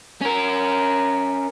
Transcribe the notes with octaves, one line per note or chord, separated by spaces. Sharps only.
C#4 A#4